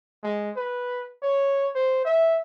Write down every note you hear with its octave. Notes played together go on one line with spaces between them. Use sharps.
G#3
B4
C#5
C5
E5